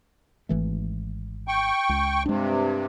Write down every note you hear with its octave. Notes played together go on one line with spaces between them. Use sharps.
G#1 E3 A3
G5 C#6
C#2
G2 C3 G#3 D4